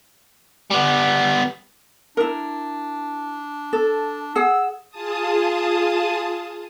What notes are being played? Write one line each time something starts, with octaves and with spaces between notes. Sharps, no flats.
G3 B3
D4 E4 A#4
A4
G#4 F#5 E6
F4 G#4 A5 D#6